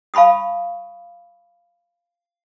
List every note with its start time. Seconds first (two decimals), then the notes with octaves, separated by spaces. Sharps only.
0.14 F5 A5 B5 C#6 D#6